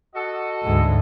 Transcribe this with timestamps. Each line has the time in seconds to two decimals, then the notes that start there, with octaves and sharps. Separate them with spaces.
0.15 F#4 A4 D#5
0.63 D2 G#2